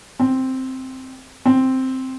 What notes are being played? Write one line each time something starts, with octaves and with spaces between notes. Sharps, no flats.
C4
C4